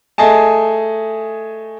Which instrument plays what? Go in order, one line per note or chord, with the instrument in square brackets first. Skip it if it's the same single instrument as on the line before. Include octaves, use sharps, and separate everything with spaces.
[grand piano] A3 G#4 D#5 G#5 A5